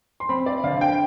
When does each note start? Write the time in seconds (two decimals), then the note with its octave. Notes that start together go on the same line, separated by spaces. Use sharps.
0.20 C6
0.29 C4 B5
0.46 D5
0.64 D3 F5
0.81 G5